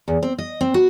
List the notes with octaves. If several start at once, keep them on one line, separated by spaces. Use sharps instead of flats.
E2
C4
D#5
C4
F#4